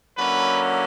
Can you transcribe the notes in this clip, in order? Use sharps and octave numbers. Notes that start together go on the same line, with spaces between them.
D3 F#3 A#3 C#4 E4 B4